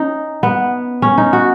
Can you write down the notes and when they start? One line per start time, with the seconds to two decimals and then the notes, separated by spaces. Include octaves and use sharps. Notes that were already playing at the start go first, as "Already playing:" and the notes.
Already playing: C#4 D#4
0.43 B3
1.02 C#4
1.18 D#4
1.33 F#4